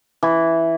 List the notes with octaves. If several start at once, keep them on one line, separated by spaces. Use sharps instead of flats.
E3